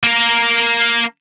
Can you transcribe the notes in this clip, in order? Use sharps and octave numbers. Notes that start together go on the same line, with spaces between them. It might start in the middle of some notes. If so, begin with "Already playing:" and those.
A#3 A#4